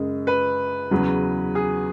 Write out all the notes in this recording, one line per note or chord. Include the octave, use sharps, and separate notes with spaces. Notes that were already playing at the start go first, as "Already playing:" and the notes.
Already playing: F#2 C#3 G#3
B4
E2 C#3 F#3
G#4